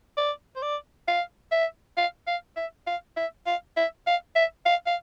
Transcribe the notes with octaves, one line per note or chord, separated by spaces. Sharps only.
D5
C5
D5
F5
E5
F5
F5
E5
F5
E5
F5
E5
F5
E5
F5
F5